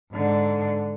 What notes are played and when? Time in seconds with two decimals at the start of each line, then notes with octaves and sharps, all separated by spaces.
0.13 G#2 D3